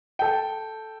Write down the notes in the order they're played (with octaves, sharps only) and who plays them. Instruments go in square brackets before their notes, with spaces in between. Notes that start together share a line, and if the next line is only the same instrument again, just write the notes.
[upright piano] A4 G5